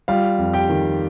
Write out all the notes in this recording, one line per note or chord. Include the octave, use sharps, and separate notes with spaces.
G3 F4 F5
F2
G4 G5
D#3